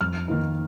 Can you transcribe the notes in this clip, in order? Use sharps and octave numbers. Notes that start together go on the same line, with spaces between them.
F2 F6
D#3 A#3 D#4